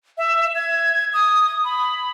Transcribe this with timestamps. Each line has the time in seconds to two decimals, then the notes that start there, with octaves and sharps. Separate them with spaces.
0.18 E5
0.55 G#6
1.13 D#6
1.64 B5